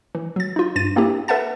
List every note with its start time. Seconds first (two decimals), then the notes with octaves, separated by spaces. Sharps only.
0.15 E3
0.36 F#3 A6
0.56 D#4 F4
0.76 G2 A6 D#7
0.96 A#3 C4 D4 E4 G4
1.28 A4 B4 E5 F#5 A5 A6